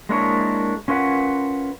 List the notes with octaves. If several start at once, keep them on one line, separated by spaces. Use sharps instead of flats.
G#3 A#3 D4 E4 A#4 C#5
C#4 F4 A#4 B4 F#5